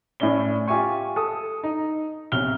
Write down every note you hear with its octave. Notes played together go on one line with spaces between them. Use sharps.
A2 A3 C#4 D5 G7
F4 G4 E5 G#5 C#6
A4 D#6
D#4
B1 C3 F#4 F6 G7